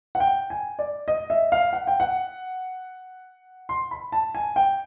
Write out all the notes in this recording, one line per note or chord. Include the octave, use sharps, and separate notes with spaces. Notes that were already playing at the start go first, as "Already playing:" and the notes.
F#5
G5
G#5
D5
D#5
E5
F5
F#5
G5
F#5
C6
B5
A5
G#5
G5